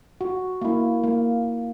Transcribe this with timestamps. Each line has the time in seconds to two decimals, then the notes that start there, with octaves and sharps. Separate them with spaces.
0.21 F#4
0.62 A#3 E4
1.03 A#3